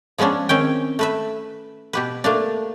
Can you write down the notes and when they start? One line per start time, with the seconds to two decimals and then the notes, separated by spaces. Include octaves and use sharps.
0.18 F3 G#3 B3 C#4 D4
0.49 D#3 C4 C#4 G5
0.99 A3 B4 E5
1.93 B2 G4 B4
2.24 A3 A#3 D4